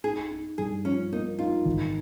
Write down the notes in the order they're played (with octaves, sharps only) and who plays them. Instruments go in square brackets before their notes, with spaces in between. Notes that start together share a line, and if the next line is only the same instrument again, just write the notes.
[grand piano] D#4 [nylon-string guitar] G#4
[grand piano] D#4
[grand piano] G2 [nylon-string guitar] G#4
[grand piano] F3 [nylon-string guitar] C#4
[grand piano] A#3 [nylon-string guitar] D#4
[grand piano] D#4 [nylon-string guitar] F4
[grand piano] G#1